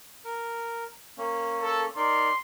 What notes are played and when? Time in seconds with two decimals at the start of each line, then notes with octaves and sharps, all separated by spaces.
0.25 A#4
1.18 A#3 C#4
1.62 A4
1.96 D#4 A#4 D5 C6